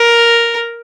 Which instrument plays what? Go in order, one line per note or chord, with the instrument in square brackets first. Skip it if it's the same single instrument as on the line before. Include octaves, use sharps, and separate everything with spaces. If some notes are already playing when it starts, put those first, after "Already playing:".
Already playing: [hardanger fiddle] A#4